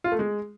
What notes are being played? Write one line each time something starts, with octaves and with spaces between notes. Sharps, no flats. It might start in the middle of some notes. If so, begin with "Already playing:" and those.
F4
A3
G#3